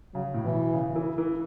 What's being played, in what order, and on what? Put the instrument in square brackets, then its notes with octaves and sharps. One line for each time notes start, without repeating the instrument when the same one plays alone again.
[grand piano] C#3 [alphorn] F#3
[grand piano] A2
[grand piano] B2 [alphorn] E3
[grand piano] C#3
E3
E3